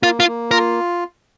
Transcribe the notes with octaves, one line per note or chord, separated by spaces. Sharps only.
A#3 F4
F4
A#3
F4 A#4